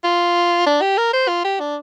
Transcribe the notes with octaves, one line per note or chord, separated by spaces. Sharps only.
F4
D4
G4
A#4
C5
F4
G4
D4